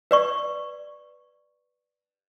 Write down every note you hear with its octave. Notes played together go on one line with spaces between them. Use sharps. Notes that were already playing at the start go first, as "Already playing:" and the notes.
B4 D5 C#6